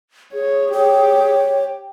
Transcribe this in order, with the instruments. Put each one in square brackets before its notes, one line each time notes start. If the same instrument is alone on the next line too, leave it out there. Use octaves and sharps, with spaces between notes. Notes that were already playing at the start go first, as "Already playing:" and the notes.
[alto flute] G#4 [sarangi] C#5
[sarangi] G4 [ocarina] C#5